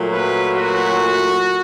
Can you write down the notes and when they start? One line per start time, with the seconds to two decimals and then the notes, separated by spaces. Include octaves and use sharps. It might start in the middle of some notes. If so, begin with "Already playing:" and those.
Already playing: A#2 F#3 A3
0.10 B4
0.53 F#4